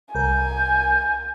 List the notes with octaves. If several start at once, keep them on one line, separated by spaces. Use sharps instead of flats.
C2 A#4 G#5 G6